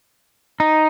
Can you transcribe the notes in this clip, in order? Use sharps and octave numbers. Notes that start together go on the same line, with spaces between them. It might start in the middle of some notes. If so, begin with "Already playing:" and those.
D#4